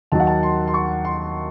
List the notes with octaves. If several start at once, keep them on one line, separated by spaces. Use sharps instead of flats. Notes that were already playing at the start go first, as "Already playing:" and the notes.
D#2 D#3 F#3 A5
F#5
A5
C6
C6
C#6
C6